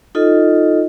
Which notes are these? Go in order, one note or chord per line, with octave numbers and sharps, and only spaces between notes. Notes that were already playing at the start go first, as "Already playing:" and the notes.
D#4 F4 A4 D#5